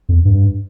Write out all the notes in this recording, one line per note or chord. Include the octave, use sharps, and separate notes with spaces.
F2
G2